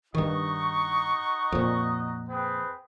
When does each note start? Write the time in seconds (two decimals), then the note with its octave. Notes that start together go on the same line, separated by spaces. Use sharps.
0.15 G2 D#3 D#4 F#4 D#5 C#6
1.52 F2 A#2
2.28 C4 G#4 B4